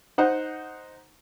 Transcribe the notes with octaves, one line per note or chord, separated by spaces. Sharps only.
D#4 C5 F#5